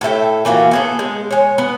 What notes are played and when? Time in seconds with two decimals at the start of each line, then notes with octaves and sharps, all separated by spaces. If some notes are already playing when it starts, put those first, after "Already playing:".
0.01 A2 A4 E5 G5
0.45 E3 A#3 F4 F#4
0.71 B3 G#4 A4
0.99 G#3
1.31 G#3 C#5
1.58 B3